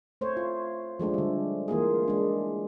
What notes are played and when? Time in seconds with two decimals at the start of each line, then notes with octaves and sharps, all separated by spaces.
0.21 A3 C5 C#5
0.37 F4
1.00 F3 G#3 A3 D4
1.14 D3 G3
1.68 E3 A#3 F4 G#4
2.08 G#3 D4